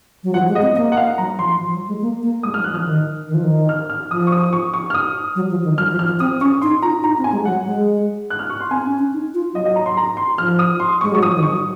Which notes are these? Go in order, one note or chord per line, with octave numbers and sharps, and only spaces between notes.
F#3
F3 F#5
G#3
D#5
C4
A#3 D#5
F#5
F5
F#3 A#5
F3 C6
F3
F#3
G#3
A#3
A#3
G#3 D#6
F6
F#3
F#6
F3
F6
D#3
D#3
F3
D#3
F6
F6
F3 D#6
C#6
D#6
C#6
C#6
F6
D#6
F#3
F3
D#3
F#3 F6
F3
F6
F3
C4 D#6
C#4 C#6
D#4 C6
F4 A#5
D#4 A#5
C4
G#5
G#3
F#3 F#5
G#3
F#6
F6
C#6
C6
C4 G#5
C#4
C#4
D#4
F4
F#3 D#5
D#5
A#5
C6
A#5
C6
F3 F6
D#6
C6
G#3 C#6
F#3 C#6
F3 D#6
D#3
C#6
F#3